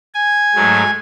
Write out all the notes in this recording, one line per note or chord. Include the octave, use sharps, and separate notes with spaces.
G#5
G#2 F#3 A3